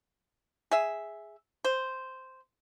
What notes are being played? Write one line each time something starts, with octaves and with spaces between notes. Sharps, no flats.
G#4 E5
C5